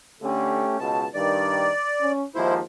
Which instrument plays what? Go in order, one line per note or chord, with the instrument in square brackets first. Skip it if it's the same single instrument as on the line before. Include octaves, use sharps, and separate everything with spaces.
[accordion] D3 [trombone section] A3 C#4 G4
[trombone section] C#2 B2 [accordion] A5
[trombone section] G2 D#3 [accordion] D5
[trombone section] C#4
[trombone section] D#2 G#2 F3 [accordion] E4 C5